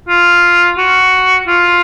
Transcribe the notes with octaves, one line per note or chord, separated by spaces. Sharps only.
F4
F#4
F4